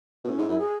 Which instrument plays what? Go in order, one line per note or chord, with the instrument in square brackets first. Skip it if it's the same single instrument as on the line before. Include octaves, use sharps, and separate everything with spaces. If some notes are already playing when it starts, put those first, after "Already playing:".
[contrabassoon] B2 [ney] B3
[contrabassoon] A2 [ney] C#4
[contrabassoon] G#2 [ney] E4
[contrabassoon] F#2 [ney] E4
[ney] G#4